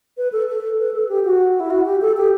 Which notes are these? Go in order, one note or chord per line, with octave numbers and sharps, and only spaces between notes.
B4
A4
A4
B4
A4
G4
F#4
E4
F#4
G4
A4
G4